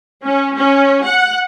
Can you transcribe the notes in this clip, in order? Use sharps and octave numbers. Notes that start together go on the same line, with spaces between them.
C#4
C#4
F#5